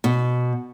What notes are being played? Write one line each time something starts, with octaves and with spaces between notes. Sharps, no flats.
B2